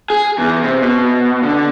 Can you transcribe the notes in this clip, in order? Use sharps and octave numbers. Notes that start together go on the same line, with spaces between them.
G#4
E2
C3
B2
D3